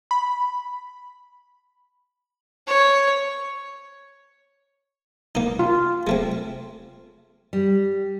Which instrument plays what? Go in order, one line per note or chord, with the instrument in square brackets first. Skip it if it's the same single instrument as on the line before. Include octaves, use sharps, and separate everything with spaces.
[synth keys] B5
[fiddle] C#5
[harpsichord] A#3 D#4
[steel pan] F4
[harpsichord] G#3 A3 C4
[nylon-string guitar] G3